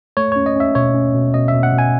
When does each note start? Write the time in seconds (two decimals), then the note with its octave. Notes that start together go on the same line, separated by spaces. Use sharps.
0.17 A3 C#5
0.32 C#4 C#5
0.46 D#5
0.56 C#4 E5
0.75 B2 C#5
0.94 C#4
1.14 B2
1.34 B2 D#5
1.48 E5
1.53 B2
1.63 F#5
1.73 B2
1.78 G#5